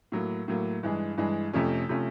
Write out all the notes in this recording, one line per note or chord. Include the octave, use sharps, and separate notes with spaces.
A2 F#3 A#3
A2 F#3 A#3
G2 E3 G#3
G2 E3 G#3
F2 C3 F3 A3 C#4
C3 F3 A3 C#4